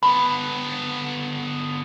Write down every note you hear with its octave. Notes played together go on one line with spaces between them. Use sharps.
D3 B3 B5